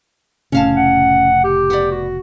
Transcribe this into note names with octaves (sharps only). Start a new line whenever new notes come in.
F1 A2 C#3 C#4 F5 A5
F#5
G4
B3 D5
F#4